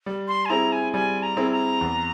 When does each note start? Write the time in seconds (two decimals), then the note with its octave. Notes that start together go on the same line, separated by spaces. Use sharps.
0.06 G3
0.28 C6
0.46 G#5
0.50 C4 E4 G#4 A#5
0.72 G#5
0.93 G3 G#5
1.23 A#5
1.37 C4 E4 G#4
1.52 A#5
1.81 E2